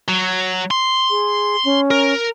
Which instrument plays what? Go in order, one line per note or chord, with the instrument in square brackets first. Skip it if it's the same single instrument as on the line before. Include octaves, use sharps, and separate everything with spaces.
[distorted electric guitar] F#3
C6
[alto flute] G#4
C#4
[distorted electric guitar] A#4